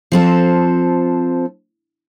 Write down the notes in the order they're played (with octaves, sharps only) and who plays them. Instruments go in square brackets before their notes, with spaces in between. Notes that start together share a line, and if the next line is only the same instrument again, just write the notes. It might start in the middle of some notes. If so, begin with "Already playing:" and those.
[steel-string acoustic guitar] F3 C4 A4